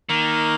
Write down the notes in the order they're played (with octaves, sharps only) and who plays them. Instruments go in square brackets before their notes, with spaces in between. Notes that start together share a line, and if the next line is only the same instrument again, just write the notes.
[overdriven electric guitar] D#3 [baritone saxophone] A#3